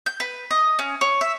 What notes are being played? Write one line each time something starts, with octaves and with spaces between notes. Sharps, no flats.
G6
B4
D#5
C#4
C#5
E5